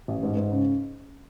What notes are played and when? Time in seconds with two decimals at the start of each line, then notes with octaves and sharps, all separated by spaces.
0.08 A1
0.23 G#2
0.37 G#2
0.52 C#3